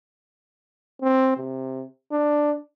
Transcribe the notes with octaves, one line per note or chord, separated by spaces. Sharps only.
C4
C3
D4